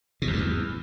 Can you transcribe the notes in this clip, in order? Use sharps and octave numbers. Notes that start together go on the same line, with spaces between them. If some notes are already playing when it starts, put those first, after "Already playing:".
B2
E2
G2
E2